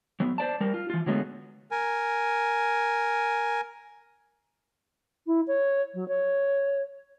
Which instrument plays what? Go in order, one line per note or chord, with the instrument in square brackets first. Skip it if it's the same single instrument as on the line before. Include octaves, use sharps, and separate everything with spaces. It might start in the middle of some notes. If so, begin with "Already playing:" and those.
[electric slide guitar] F#3 B3
C5 D5 A5
G3 A#4
F4
E3 F4
D3 F#3 G#3 A3 B3
[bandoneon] A#4 G#5
[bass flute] E4
C#5
F#3
C#5